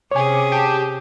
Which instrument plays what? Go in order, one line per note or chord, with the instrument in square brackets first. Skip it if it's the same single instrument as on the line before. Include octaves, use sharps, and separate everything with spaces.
[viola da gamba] C3 C#4 G#4 [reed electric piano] C#5 G#5 [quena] D6
[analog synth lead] G4 [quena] A5